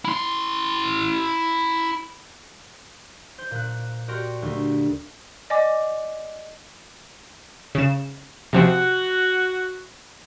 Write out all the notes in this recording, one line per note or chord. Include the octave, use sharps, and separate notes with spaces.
E4 C6
C5
A#2 F#6
F#4 G4 A#4 D5 C6
D2
D5 D#5 G#5 D6
C#3 E7
C3 F3 C4 F#4